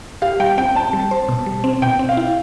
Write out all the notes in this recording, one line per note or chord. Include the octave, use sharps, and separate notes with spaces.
G4 F5
G3 G5
C4 G5
C4 A5
G3
C5
B2
G3
C4
B2 G5
C4
F5
E4